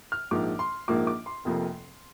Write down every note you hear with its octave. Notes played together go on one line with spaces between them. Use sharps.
F6
A#1 G#2 F3 A#3 D6
C6
A#1 G#2 F3 A#3 D6
D6
C6
F1 F2 C3 F3 A#3